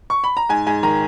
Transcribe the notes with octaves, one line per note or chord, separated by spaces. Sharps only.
C#6
B5
A#5
G#2 G#5
G#2 G#5
D#3 A#5